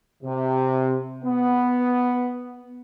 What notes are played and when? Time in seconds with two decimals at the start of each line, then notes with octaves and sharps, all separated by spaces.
0.23 C3
1.24 B3